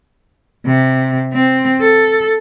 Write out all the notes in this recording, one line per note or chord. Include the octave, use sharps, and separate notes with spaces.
C3
C4
A4